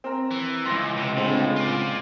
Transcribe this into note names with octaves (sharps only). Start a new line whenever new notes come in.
C4 A#4
E3
C#2 F#2 C6 A6 A#6
C3
A2 D3 C4 G#4
F4 D5